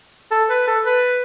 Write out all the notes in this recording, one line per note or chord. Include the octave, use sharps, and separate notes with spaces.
A4
B4
A4
B4